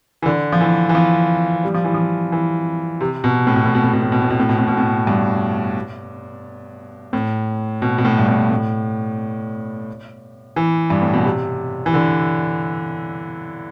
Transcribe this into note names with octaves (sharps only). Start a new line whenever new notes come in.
E3
D3
F3
E3
E3
F3
G3
F3
E3
F3
E3
C3
B2
A2
B2
A2
B2
A2
B2
A2
B2
A2
B2
A2
B2
A2
B2
A2
G2
A2
B2
B2
A2
G2
A2
A2
E3
G2
A2
B2
C3
E3
D3